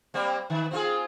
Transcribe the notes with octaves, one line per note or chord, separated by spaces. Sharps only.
G3 A#3 C4
D#3
C4 F4 G#4